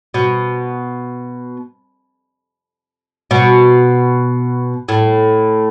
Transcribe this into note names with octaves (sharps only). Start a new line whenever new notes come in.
B2
B2
A2